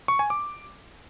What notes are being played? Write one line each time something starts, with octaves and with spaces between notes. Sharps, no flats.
C#6
G#5
D6